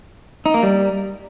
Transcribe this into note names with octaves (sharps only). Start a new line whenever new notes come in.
D#4
A#3
G3